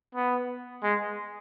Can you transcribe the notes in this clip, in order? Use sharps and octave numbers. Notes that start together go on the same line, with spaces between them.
B3
G#3